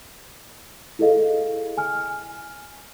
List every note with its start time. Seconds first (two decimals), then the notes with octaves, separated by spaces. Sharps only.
0.99 E4 G#4 A4 D#5 F5
1.78 G#5 F6